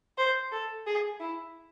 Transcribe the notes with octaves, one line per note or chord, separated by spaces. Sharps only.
C5
A4
G#4
E4